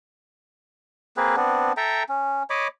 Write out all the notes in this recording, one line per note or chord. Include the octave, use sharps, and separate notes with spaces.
A#3 C4 G#4 B4
B3 C4 D4
A4 E5 G5 A#5
C#4
C#5 D#5 B5 D6